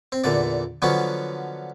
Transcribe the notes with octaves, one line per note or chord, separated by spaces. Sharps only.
C4
E2 A#2 D3 D5
D3 F3 F#3 B3 C#4